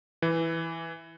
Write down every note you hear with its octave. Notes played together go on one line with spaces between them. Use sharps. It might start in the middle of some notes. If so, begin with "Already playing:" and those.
E3